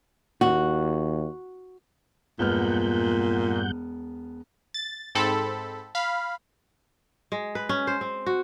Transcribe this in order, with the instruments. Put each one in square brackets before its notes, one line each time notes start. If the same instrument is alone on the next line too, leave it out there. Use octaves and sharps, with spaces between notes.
[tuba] D#2 [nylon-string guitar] F#4
[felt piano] E1 B3 F6 [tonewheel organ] G2 F#5 G6 [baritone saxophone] A#2
[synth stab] A6
G#2 C4 A4 B5
F5 B5
[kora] G#3
B4
C#4
C5
C4
F#4